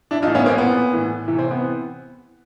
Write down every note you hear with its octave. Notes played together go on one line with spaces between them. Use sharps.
D4 E4
A2 E3 D#4 F4
B3 C#4
A#3 C4
A#2 B3
A2 E3
C3 E3
C4
B3